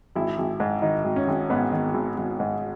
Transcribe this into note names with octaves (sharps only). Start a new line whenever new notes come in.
G#1 E4
G#1
G#2
D#3 D#4
G#1
C#4
G#1
G#2 B3
D#3
G#1
G#1
G#2